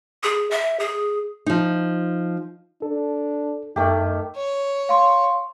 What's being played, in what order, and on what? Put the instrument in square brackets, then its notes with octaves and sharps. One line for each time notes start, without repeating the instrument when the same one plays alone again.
[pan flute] G#4
E5
G#4
[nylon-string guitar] F3 D#4
[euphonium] D4 [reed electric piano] A4
[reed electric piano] F#2 [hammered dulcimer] D#3 A3 G4 [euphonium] D#4
[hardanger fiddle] C#5
[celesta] F5 C6